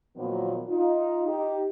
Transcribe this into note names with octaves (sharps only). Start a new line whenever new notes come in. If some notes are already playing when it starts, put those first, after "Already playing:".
A#2 D#3 F3 F#3 A#3 B3
D#4 F4
D#4 G4